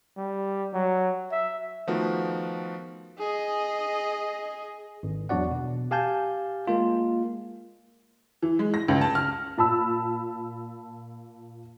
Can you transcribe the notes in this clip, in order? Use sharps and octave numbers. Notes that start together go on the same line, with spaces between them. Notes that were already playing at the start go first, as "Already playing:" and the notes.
G3
F#3
E5
D#3 F3 A3 B3 F#4
G#4 D#5
G#1
E2 F#3 D4 F#4 D5 F#5
B2
G4 F5 G#5 A5 G6
G#3 A#3 F4
E3
G#3
A#6
C#2
A5
F6
A#2 A5 B5 E6